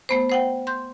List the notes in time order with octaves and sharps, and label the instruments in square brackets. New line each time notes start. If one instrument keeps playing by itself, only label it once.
[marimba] A3 B3 C5
C5 F#5 G5
C6 G6